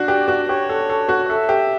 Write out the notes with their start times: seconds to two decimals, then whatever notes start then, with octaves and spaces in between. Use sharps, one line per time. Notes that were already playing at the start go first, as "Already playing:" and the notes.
Already playing: D4 F#4
0.08 G4 D5
0.28 F#4
0.49 G4 C#5
0.69 A4
0.90 A4
1.09 F#4
1.29 A4 E5
1.49 G4